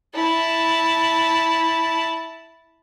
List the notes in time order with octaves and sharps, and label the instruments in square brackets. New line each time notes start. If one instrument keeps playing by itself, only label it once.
[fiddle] E4 A5